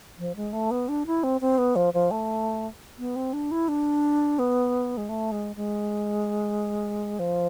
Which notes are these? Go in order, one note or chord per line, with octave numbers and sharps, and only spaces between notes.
F3
G#3
A3
B3
D4
E4
C4
C4
B3
F3
F3
A3
B3
C4
D4
E4
D4
B3
G#3
A3
G#3
G#3
F3